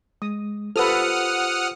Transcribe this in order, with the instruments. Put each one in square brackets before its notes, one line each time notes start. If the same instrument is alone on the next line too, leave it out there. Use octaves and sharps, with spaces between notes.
[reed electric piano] G#3 [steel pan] D#6
[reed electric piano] F4 G4 C5 [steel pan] A4 B4 [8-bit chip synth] F#5 D#6 F6